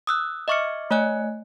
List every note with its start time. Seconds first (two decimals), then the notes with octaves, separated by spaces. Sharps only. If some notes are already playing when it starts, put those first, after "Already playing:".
0.07 D#6 E6 F#6
0.48 D#5 E5 C#6 D6 F6 C#7
0.91 A3 C#5 D#5 G#5 F#6